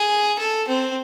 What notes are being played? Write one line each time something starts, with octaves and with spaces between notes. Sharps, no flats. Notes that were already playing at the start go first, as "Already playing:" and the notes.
Already playing: G#4
A4
C4